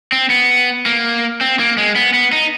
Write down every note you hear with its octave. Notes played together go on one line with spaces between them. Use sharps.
C4
B3
A#3
C4
A#3
G#3
B3
B3
D#4